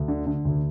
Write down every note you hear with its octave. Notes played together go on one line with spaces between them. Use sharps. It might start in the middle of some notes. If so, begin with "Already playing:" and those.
Already playing: D2
D3
D3
D2